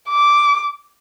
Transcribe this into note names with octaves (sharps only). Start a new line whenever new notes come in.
D6